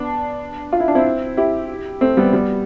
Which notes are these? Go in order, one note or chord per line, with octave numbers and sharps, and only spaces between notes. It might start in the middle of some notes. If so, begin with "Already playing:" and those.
Already playing: B3 D4
F4
E4
D4
C4 E4
E4 G4
A3 C4
G3 B3
G3 B3